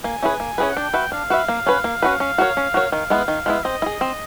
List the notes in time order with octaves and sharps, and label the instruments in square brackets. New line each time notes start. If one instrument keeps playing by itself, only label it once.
[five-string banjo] A#3 [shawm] G#5
[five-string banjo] C#4 E4 G#4 B4
A#3
C#4 E4 G#4 B4
[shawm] F#5
[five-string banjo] D4 [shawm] G5
[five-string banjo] F#4 B4 E5
[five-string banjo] D4 [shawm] F5
[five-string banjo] F#4 B4 E5
A#3
C#4 F#4 B4
A#3
C#4 F#4 B4
[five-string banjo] C#4 [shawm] F5
[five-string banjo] F#4 A#4 C#5
C#4
F#4 A#4 C#5
[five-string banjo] D#3 [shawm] F5
[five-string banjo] G#3 B3 E4
D#3
G#3 B3 E4
[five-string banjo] C4 [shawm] D#5
[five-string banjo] E4
G#4
C4